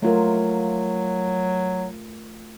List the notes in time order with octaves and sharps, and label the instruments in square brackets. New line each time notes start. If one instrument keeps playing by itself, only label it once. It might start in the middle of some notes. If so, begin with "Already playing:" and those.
[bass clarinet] F#3 [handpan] A3 F4 A#4